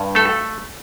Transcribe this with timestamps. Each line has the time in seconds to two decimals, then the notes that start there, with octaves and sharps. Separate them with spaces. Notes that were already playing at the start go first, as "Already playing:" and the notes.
Already playing: G2
0.15 A3 A4